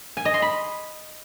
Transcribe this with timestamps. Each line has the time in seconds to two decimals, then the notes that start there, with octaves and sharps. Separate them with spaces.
0.17 G#5
0.25 D#5
0.34 C6
0.42 B5